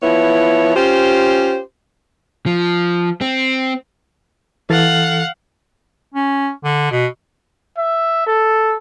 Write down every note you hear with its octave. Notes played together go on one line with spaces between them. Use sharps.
F3 B3 E4 C#5
C#4 F4 G4 C5
F3
C4
E3 A4 F5 F#5 A6
C#4
D3
B2
E5
A4